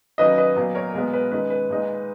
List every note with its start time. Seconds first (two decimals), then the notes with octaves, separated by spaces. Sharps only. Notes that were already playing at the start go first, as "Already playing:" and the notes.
0.18 D#3 F#3 A#3 C#4 B4 D#5
0.38 B4 D#5
0.56 A#2 F#3 B3
0.75 A#4 C#5
0.94 B2 G#3 B3 A#4
1.13 B4
1.32 D#3 G#3 C#4 B4
1.50 B4
1.70 A#2 G#3 D#4